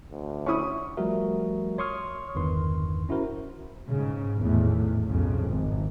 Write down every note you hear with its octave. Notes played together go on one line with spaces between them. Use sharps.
D2
C#4 E4 C#6 D#6
F3 G3 A3 F#4 A#4 E5
C#5 C6 C#6 D#6 F6
G1 E2 G2 D#3 B4 C6
C#4 E4 F#4 A#4 C5
G#2 C#3
G#1 E2 A2 A3
B1 F2 C#3
G#1